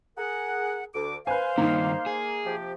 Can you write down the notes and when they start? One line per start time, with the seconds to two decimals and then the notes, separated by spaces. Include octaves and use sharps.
0.18 G#4 A#4 F#5
0.95 D2 D6
1.27 B4 C5 F5 G#5
1.58 G2 D#3 A#3 D#4
2.06 G#4
2.46 C3 F3 G4